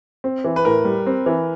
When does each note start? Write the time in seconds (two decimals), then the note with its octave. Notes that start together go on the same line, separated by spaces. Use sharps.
0.24 C4
0.44 E3
0.56 B4
0.65 A2 A#4
0.85 G3
1.06 C4
1.26 E3